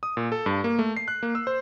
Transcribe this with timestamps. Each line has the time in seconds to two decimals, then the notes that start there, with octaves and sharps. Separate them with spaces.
0.03 D#6
0.17 A#2
0.32 A4
0.46 G2
0.64 A#3
0.79 A3
0.97 C7
1.08 F#6
1.23 A#3
1.35 E6
1.47 C5